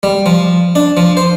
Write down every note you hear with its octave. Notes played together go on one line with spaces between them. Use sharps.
G3
F3
D4
F3
C5